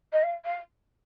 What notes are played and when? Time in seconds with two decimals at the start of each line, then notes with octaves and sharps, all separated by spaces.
0.12 D#5
0.23 F5
0.45 F5